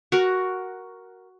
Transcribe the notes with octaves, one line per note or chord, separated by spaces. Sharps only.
F#4 A#4